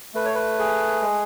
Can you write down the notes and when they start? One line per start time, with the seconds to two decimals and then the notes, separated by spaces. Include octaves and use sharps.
0.14 A3 B4
0.25 C#5
0.35 B4
0.59 G#4
1.01 G#3